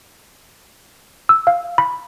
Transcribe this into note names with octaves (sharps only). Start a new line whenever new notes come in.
E6
F5
B5